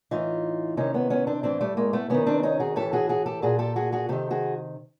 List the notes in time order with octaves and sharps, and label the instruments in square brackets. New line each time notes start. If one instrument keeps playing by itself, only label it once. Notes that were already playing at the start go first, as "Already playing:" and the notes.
[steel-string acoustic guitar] A2 E3 D#4 F4
C3 D#3 C#4 D#4
B3 C#4
B3 C#4
C4 D4
A2 E3 C4 D4
G3 A3
G#3 A#3
A3 B3
C3 D#3 B3 C#4
C4 D4
C#4 D#4
F#4 G#4
A2 E3 G4 A4
F#4 G#4
F#4 G#4
G4 A4
A#2 F#4 G#4
G4 A4
F#4 G#4
F#4 G#4
C3 D#3 G4 A4
F#4 G#4